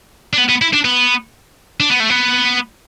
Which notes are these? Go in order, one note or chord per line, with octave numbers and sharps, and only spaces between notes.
D4
B3
B3
E4
D4
B3
D4
B3
A3
B3